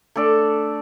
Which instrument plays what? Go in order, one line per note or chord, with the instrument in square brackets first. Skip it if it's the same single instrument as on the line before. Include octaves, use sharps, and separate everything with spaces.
[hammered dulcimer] A3 D4 A4 D5